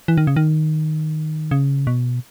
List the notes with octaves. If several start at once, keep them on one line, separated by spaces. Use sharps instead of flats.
E3
D#3
C#3
D#3
C#3
B2